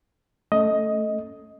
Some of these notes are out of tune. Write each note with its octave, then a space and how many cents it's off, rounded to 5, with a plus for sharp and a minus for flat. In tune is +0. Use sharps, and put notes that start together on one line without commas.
A3 +0 C#4 +0 D#5 +10